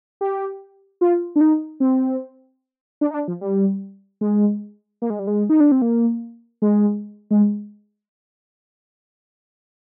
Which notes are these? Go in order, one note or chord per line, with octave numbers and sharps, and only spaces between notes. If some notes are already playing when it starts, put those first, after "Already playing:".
G4
F4
D4
D#4
C4
D4
D#4
D4
F3
G3
G#3
A#3
G#3
G3
G#3
D#4
D4
C4
A#3
G#3
G#3